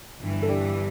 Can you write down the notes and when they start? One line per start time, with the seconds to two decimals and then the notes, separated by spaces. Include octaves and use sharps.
0.20 G1 G2 E3
0.42 A4
0.49 D4 G4